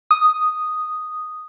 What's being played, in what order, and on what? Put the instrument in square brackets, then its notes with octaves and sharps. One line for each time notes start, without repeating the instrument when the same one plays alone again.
[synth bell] D#6